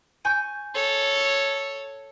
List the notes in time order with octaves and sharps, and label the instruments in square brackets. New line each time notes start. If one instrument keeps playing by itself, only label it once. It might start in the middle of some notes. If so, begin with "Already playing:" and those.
[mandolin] G#5 C#6 G6
[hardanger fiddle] A4 C#5